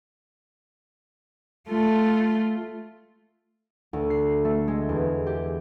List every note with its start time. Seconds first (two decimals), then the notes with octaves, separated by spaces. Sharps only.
1.69 A3 F4
3.93 D2
4.10 C7
4.45 A3
4.68 G#3
4.89 E2
5.27 G4